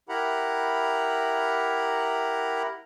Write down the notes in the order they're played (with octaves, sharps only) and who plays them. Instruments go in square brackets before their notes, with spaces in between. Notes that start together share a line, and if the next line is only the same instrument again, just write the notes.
[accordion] E4 G4 A#4 F#5 A#5 B5